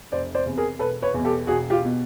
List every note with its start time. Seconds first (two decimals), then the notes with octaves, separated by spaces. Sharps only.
0.12 F1 C5 D5
0.35 C5 D5
0.46 E2 C3
0.57 G#4 A#4
0.79 E1 A4 B4
1.02 B4 C#5
1.14 E2 B2
1.25 G4 A4
1.47 E1 F#4 G#4
1.70 F4 G4
1.85 B2